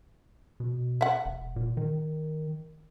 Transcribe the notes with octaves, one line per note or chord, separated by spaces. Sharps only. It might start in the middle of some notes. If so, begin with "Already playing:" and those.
B2
E5 F#5
E1
A#2
D#3